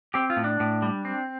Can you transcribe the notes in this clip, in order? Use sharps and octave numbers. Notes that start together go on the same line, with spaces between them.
C4 G4
F4
A2
D4
A2
G3
C4